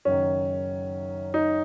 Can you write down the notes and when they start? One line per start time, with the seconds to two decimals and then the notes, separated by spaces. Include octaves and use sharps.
0.05 F#1 F#2 D#3 C#4
1.34 D#4